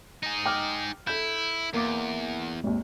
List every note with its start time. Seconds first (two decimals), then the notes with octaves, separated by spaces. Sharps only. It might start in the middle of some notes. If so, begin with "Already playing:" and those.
0.23 D#4 G#4
0.46 G5 D6 F6
1.07 E4 A4 G6
1.74 E2 A#3 D6
2.64 G#1 D#2